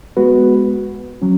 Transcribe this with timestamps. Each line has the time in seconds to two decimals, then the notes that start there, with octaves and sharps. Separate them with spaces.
0.17 G#3 B3 F#4 B4
1.22 F#3 C#4